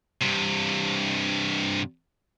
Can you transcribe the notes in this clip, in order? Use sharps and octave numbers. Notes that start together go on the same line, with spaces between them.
G2 C3